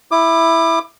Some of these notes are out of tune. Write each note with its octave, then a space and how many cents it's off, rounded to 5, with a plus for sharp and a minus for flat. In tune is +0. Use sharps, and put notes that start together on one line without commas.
E4 +0 D6 +30